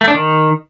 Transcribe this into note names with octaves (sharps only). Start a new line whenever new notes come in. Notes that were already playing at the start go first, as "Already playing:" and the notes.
A3
D4
D#3